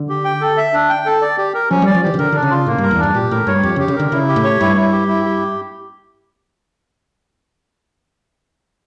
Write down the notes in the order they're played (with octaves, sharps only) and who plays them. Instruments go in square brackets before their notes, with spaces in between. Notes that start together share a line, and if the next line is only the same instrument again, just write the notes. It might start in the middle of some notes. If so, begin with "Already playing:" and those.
Already playing: [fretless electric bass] D3
[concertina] G4
G5
A4
E5
D4
G5
A4
D5
G4
A#4
[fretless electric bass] F3 [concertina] C#4
[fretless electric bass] G3 [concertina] D5
[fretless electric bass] F3
[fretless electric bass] E3 [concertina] G4
[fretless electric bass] C#3
[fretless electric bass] D3 [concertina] A#4
[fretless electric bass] D3 [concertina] D4
[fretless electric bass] C#3
[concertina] F4
[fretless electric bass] A2 [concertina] A#3
[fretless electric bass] G2 [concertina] A#4
[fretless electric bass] E2
[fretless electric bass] G2 [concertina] D4
[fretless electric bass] A#2 [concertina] G4
[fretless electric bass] A2 [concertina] A#4
[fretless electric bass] G2 [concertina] C#5
[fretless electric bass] F2 [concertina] G4
[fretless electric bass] C#3
[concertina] G4
[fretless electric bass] C#3
[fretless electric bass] D3 [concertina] A#4
[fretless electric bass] C#3 [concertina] E4
[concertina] G4
[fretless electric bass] A2
[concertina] C#5
[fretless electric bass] G2 [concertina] E4
[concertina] E4
G4
E4
G4